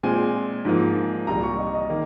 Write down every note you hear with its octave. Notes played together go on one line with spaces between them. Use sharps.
A#2 G#3 C4 G#5
G#2 F3 A#3
C2 A#2 G3 A#5
C#6
D#5
D#5
D#3 A#3